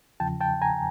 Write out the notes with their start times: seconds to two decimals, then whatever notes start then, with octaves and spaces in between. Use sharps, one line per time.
0.20 E2 C#3 F3 G5 A5
0.41 G5 A5
0.62 G#5 A#5